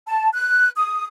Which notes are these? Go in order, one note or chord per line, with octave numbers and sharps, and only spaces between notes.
A5
F#6
D#6